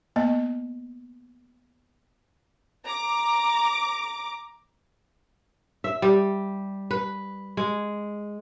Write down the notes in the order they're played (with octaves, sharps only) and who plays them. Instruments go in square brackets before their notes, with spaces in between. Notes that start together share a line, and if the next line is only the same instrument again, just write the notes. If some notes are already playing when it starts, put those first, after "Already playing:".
[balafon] A#3 B3 D#5
[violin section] A#5 D6
[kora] E5
G3
B4
G#3